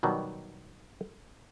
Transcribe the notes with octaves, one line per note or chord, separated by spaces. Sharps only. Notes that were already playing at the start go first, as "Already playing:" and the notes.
B2 D#3 F#3 G3